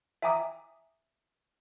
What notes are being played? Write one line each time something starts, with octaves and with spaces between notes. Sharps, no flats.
E5 G5 G#5 A#5 D6 D#6